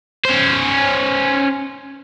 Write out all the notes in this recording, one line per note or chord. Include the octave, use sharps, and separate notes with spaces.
C#4 C5